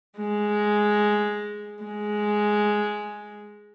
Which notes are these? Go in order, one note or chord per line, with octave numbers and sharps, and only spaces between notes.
G#3
G#3